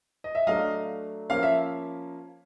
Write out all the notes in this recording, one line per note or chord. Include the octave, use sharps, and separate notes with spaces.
D#5
E5
F#3 A3 D4 D#5 F5
F3 A#3 C#4 F5
E5